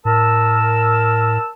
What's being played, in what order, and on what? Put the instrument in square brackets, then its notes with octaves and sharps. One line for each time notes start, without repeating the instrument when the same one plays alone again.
[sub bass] A2 [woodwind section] A#4 A5 E6